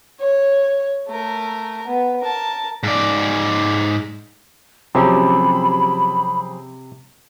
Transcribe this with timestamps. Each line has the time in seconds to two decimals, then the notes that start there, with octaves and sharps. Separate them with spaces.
0.20 C#5
1.08 A3 A#4
1.87 B3
2.20 A#4 A5
2.83 G#2 D5
4.95 C3 F3 F#3 C4 C#4 G4 G#4 B5